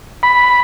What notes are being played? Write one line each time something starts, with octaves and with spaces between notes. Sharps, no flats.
B5